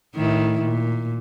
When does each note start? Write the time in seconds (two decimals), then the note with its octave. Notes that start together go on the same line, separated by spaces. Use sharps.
0.15 A2 D#3 E4
0.63 A#2